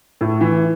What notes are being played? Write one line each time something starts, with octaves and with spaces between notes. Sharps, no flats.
A2
E3